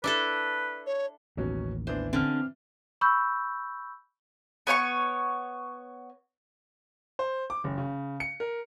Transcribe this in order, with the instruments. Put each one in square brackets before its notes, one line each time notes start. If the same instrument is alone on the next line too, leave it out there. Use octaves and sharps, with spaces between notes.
[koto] D4 E4 A4 [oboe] B4
[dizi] C#5
[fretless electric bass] A1 D#2 [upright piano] B2 F#3 C#4
[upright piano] E3 B3 D4 [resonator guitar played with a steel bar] C5
[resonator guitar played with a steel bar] D3 C#4 [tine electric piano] C4 F6
[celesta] B5 C#6 E6 G6
[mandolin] B3 C#5 G5 C#6
[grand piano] C5
D6
F#1
C#3
C#7
A#4